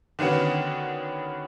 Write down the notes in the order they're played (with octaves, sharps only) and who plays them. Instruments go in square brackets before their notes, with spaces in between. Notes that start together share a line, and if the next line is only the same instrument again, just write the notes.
[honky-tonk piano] D3 D#3 B3 C#4 F#4